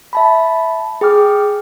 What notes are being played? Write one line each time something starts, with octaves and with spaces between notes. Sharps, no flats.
E5 A5 B5
G#4 G5 D6 F6